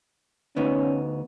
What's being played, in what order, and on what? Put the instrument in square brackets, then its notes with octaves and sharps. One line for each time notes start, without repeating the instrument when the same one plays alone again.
[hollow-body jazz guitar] D2 B3 D#4 [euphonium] C#4